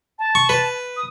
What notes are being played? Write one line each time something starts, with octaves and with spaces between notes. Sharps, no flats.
A5
C#6
B4
D#6